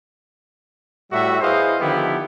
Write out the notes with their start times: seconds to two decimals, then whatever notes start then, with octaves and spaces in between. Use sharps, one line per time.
1.11 A2 G3 E4 F#4 E5
1.41 E4 G#4 B4 C5 D#5 F5
1.80 D3 D#3 F3 B3 E4 G4